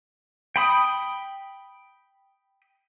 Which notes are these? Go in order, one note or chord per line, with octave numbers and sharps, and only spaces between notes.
G5 B5 D#6